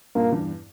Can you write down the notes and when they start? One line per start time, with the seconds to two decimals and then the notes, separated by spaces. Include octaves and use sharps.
0.15 G2 A#2 A#3
0.32 E2 G2